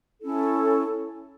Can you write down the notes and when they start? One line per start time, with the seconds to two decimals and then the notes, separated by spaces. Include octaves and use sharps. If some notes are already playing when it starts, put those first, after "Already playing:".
0.21 C#4 E4 A4